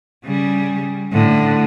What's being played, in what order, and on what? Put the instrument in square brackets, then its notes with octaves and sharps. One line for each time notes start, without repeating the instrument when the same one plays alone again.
[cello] C#3 G3
A2 D3